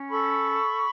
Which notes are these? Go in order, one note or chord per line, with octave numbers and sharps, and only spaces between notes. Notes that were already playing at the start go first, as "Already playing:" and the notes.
Already playing: C#4
A4 B5 C#6